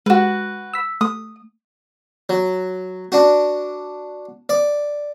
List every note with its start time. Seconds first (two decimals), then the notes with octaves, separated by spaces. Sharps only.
0.06 G#3 F#4 B4
0.74 E6 B6
1.01 A3 D#6
2.29 F#3
3.12 D4 F#4
4.49 D5